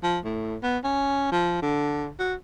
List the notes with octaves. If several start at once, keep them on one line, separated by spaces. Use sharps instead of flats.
F3
A2
B3
C#4
F3
D3
F#4